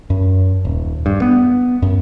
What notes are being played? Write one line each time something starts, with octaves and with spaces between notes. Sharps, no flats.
F#2
D#1
G2
B3
F#2